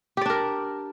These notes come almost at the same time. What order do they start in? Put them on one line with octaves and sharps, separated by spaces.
G4 D5 D4 A#4